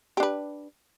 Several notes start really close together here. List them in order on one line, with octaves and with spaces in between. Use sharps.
G4 D4 B4